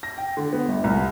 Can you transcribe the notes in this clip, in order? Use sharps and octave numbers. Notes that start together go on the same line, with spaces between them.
A#6
G5
D3
B3
G1
C2